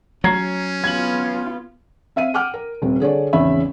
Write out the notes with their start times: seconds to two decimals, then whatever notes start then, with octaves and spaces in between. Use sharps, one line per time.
0.24 F#3 C#4 A#5 G#6 C7
0.84 B3 F4 G#6 F#7
2.16 C4 E5 F5 D#7
2.34 F#5 G5 D6 F6
2.54 A#4
2.82 D#1 C3 C4
3.00 D3 G#4 C#5 D5
3.33 G#1 E2 C#3 C#4 E5 B5